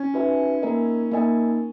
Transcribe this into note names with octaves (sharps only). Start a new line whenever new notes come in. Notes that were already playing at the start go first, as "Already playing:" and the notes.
Already playing: C#4
D#4 F#4 B4 E5 G#5
A#3 D#4 A#4 D#5 G#5
A#3 D#4 A#4 D#5 G#5